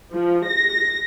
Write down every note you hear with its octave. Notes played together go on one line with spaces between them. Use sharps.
F3
A#6